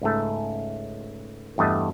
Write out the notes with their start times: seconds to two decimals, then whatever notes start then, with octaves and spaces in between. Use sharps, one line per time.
0.02 C#2 G#2 A3
1.58 E2 G2 A3 D#5 A5